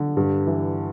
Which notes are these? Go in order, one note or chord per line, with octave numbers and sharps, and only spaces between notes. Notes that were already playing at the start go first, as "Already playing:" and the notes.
Already playing: D3
G2
E3